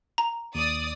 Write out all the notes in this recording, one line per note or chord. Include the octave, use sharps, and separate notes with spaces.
A#5
D#2 D5 D#6